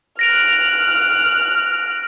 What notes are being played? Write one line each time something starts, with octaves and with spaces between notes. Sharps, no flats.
F6 F#6 A#6 D7 F7